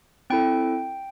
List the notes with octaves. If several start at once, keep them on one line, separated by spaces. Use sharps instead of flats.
C4 E4 A4 G5